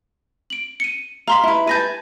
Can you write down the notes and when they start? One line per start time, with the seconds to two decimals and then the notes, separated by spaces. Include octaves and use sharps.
0.50 D7 F#7
0.80 C#7 D#7
1.28 F5 A#5 C6 B6
1.43 E4 B4
1.67 B4 G#5 A5 G6 A#6 D#7